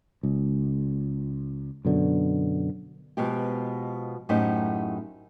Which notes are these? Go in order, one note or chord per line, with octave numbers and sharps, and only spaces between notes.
C#2
F#2 B2 D3
B2 F3 G#3 G4
F#2 A2 D#4 G4 C5 F#5